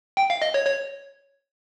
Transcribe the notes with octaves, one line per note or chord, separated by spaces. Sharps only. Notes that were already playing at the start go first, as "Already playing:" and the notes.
G5
F5
D#5
C#5
C#5